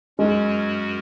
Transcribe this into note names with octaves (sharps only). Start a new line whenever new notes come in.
F#2 F#3 G#3 C#4 F#4 A#4